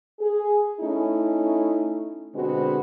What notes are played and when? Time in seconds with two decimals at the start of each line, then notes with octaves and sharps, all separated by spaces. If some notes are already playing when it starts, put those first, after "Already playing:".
0.19 G#4
0.80 A3 C#4 D#4 E4
2.34 B2 D3 G#3 B3 C4 F#4